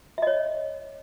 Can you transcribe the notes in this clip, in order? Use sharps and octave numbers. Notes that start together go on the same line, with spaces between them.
C#5 D#5 E5